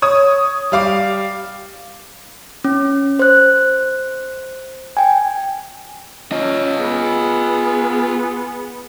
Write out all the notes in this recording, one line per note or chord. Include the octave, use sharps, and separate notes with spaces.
C#5 D#6
G3 F5 D6
C#4
C5 F#6
G5 G#5
C#4 F4 D#5
B3 G#4